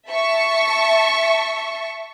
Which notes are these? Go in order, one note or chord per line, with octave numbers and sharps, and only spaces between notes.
E5 A5 C#6